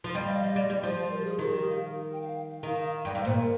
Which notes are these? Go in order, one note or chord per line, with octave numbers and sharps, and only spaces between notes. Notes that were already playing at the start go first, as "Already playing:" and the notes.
F3
G3 D#5
F5
D#5
G3 D5
G3 D5
F3 C5
C5
A#4
G4
G#4
D#3 G4
G4
A#4
F5
G5
F5
D#3
G2 G5
G#2 F5
A#2 C5
A#4